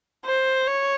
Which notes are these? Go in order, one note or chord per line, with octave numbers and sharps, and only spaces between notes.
C5
C#5